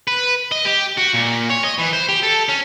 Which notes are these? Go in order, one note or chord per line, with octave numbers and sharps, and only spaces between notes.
B4
D#5
G4
F#4
A#2
C#5
D#5
E3
C5
G4
A4
C#4